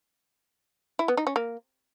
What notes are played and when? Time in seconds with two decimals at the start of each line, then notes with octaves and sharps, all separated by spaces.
0.99 E4
1.08 B3
1.17 D#4
1.27 C#4
1.36 A#3